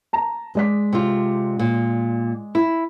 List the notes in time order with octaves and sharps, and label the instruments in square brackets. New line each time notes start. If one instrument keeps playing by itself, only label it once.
[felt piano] A5 A#5
G#3 D5 B6
[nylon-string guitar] C3 F4
A#2
E4